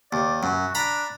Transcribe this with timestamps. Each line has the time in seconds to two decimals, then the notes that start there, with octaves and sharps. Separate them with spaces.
0.13 D#2 D5
0.43 F#2 F#4
0.75 D4 A#5 B5